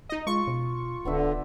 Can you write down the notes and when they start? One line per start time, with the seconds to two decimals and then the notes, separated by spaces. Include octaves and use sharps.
0.09 D#4 D#5
0.27 G#3 F4 C#6
0.47 B2
1.05 D1 D3 B3 D4 E5